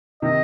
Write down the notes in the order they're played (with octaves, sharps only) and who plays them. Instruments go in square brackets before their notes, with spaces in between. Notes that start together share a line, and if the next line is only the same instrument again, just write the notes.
[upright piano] C3 D#3 [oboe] D#5